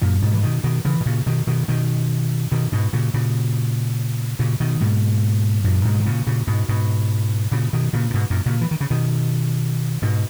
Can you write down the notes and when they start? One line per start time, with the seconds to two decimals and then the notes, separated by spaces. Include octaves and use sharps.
0.02 F#2 A#2
0.22 G#2 B2
0.33 E3
0.43 B2 D#3
0.64 B2 D#3
0.85 C#3 E3
1.00 B2
1.06 A#2 C#3
1.26 B2 D#3
1.47 B2 D#3
1.68 B2 D#3
2.52 B2 D#3
2.72 G#2 B2
2.93 A#2 C#3
3.14 A#2 C#3
4.39 A#2 C#3
4.60 B2 D#3
4.81 G#2 B2
5.64 F#2 A#2
5.85 G#2 B2
5.99 D#3
6.06 A#2 C#3
6.27 A#2 C#3
6.47 G#2 B2
6.69 G#2 B2
7.51 A#2 C#3
7.73 B2 D#3
7.93 A#2 C#3
8.10 A#2
8.14 G#2 B2
8.30 F#2 A#2
8.46 A#2 C#3
8.61 E3
8.71 D#3
8.81 C#3
8.90 B2 D#3
10.02 G#2 B2